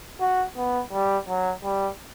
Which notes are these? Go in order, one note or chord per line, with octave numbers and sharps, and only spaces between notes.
F#4
B3
G3
F#3
G3